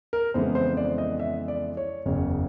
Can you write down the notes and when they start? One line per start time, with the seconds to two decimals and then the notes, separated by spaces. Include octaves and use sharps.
0.13 A#4
0.34 F2 C#3 E3 G#3 B3 C5
0.55 C5
0.77 D5
0.98 D#5
1.19 E5
1.48 D5
1.77 C#5
2.06 F#1 E2 C#3 C#5